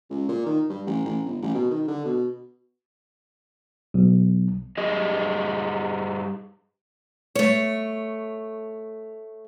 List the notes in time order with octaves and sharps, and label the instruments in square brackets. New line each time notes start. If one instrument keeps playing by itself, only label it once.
[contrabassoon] C#2
A#2
D#3
G2
A1
A1
G1
A1
B2
D#3
D3
B2
[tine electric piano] B1
[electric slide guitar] G2 G4 G#4 D#5
[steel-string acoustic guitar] A3 C#5